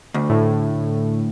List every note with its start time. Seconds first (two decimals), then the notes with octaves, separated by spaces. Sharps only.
0.14 D2
0.29 A2